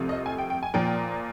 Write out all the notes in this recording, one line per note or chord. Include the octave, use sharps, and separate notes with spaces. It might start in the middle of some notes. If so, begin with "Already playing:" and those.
Already playing: C2 C3 F3 A3
D#5
G#5
G5
G5
G#5
A#2 F3 A#3 G5